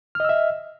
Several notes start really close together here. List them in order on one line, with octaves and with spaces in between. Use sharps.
F6 D#5 E6 E5